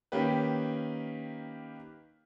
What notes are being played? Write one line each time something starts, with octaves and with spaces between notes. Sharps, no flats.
D#3 A#3 C#4 G4 B4